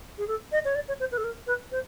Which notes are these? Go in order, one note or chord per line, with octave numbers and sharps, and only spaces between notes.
G#4
A4
D#5
C#5
D5
C#5
C5
B4
A4
A#4
B4
C5